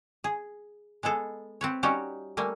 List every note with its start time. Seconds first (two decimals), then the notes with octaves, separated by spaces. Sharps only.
0.24 G#4
1.03 G#3 B3 G#4 A4
1.61 C4 B4 C#5
1.83 G3 C#4 D#4 F#4 G4 C#5
2.37 G3 A3 A#3 G#5